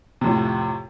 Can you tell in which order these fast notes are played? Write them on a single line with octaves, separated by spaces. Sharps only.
C3 F2 A2